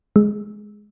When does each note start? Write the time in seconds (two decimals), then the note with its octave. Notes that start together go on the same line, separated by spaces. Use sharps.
0.16 G#3